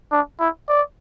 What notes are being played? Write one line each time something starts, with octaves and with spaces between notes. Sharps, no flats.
D4
E4
D5